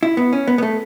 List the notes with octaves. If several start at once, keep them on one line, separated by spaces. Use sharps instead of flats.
E4
B3
C#4
B3
B3
A3